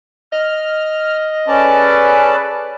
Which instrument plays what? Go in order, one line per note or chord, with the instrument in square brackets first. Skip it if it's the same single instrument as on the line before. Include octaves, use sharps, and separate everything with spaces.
[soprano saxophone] D#5 [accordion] F6
[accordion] C#4 D5 A5 [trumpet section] G#4 A4 B4